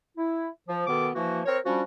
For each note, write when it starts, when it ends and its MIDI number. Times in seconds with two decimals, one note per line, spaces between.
0.17 0.49 64
0.69 0.87 53
0.87 1.10 47
0.87 1.10 51
0.87 1.10 59
0.87 1.10 69
0.87 1.10 86
1.15 1.42 52
1.15 1.42 53
1.15 1.42 58
1.15 1.42 66
1.46 1.58 60
1.46 1.58 70
1.46 1.58 73
1.66 1.82 53
1.66 1.82 55
1.66 1.82 61
1.66 1.82 62
1.66 1.82 66